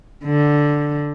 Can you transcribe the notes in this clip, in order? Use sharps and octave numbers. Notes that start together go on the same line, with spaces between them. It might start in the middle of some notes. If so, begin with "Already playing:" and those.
D3